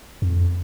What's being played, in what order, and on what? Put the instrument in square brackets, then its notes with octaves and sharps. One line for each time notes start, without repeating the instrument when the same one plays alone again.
[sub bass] F2